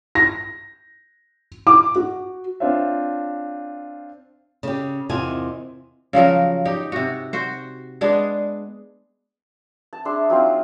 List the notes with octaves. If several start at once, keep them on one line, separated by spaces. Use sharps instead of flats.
A#6
D6
F#4
C4 D4 F4 C5 C#5 E5
C#3 G4
E2 C3 D#3 C4 F4 G#5
C#3 F3 F#3 A#4
D#4 G4
C3 F#4
F#4 C5
G#3 B3 D4 G#4
A5
D4 G#4 E5 C6
F#3 C4 D#4 F4